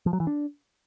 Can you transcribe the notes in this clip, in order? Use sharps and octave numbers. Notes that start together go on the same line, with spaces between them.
F3
F#3
E3
D4